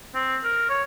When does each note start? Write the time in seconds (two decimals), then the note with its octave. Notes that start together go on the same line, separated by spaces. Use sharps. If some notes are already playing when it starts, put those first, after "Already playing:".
0.15 C4
0.44 A#4
0.69 C#5